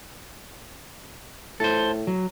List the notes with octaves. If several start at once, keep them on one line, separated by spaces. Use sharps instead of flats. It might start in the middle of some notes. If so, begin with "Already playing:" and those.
A2 A4 C5
F#3